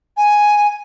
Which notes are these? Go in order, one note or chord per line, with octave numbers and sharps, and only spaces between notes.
G#5